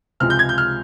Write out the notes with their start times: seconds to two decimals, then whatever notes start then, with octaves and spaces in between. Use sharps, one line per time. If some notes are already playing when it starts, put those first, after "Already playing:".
0.20 C#2 C3 F3 G#3 F6
0.30 G6
0.39 G#6
0.49 G6
0.58 F6